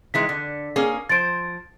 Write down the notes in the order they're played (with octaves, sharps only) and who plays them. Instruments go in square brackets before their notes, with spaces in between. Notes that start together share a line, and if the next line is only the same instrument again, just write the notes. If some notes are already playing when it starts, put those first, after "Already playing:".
[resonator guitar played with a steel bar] D#3 E3 G#3 [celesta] B6
[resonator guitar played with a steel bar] D3
A#3 C#4 G#4
[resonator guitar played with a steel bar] F3 C5 [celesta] A6 D7